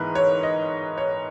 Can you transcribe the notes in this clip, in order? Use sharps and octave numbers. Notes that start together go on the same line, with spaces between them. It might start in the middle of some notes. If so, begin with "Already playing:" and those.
Already playing: G#2 E3 B3 D#4 A#4 B4
C#5
D#5
C#5